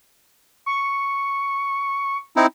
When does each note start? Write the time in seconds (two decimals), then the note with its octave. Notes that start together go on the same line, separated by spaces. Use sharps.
0.66 C#6
2.36 C4 D#4 E4